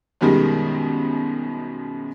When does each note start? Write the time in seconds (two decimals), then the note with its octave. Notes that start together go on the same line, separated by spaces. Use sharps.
0.21 F#2 B2 D#3 G3 G#3